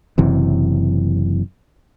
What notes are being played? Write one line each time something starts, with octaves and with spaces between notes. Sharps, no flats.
F#1 F#2 C3 E3